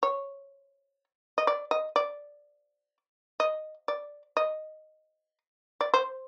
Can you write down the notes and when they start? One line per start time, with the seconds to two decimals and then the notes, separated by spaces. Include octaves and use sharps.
0.03 C#5
1.38 D#5
1.47 D5
1.71 D#5
1.96 D5
3.40 D#5
3.88 D5
4.37 D#5
5.81 D5
5.94 C5